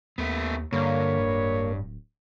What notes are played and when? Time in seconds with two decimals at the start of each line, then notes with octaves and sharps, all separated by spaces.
0.18 D#2 A3 B3
0.72 G2 D3 A#3 C#5
1.19 D1